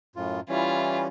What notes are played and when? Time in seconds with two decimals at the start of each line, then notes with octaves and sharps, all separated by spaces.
0.16 F#2 A2 F4
0.49 E3 G3 C#4 E4 F4